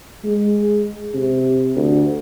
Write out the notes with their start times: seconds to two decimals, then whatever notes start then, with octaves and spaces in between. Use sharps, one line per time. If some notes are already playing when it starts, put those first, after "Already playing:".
0.25 G#3
1.14 C3
1.76 D2